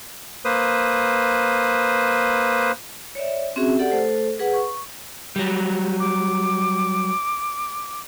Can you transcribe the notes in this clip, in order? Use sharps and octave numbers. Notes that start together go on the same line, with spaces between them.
A#3 B4 C5 D#6
C#5 D5 E5
C4 C#4 F#4 G#4 E5
G4 A4 D5 F#5
A3 A4 C5
G#4 B4 F#5
C#6
F#3 G3
D6